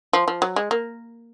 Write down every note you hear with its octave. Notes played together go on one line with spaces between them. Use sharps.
F3
F3
F#3
G#3
A#3